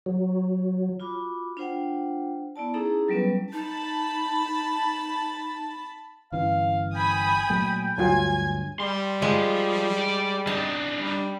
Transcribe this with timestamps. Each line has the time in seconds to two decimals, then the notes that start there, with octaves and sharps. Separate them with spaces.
0.06 F#3
1.00 F4 F#4 B5 D6
1.57 D4 F4 C5 F#5 G5
2.56 B3 E4 D5 A5
2.74 C#4 D#4 E4 G#4 A4 A#5
3.08 F#3 G3 B3 C#4 B4
3.53 D#4 A5 B5
6.32 G1 E3 C#4 F5
6.95 G5 G#5 B5 D#6
7.50 A#2 F#3 A3
7.98 D2 G2 F#3 F4 G#5 G#6
8.80 G3 C6
9.22 F3 G#3
9.99 D5
10.47 D4 D#4 A5
10.99 G3